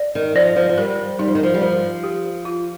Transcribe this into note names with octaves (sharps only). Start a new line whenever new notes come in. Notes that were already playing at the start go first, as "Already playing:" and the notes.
Already playing: D5
D#3
F3 D5
F3
F3
G3 A#4
G3 D#4
F3
D#3
F3
G3
F3 A#4
G4
F4